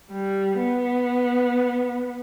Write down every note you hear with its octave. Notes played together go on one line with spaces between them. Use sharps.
G3
B3